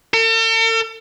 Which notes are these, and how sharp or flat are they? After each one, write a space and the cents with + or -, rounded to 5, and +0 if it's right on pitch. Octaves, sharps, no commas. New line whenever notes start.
A4 +45